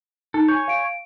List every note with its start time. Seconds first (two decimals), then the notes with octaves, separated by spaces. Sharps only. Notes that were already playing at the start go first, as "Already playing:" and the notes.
0.34 D#4 A4
0.48 C#5 G#5 G6
0.68 F5 D7